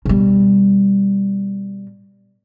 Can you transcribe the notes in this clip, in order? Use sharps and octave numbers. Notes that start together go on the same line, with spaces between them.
B2 G3